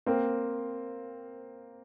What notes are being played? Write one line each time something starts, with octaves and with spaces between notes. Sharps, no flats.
A#3 C4